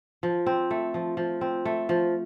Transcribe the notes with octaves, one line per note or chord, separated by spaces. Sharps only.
F3
C4
A3
F3
F3
C4
A3
F3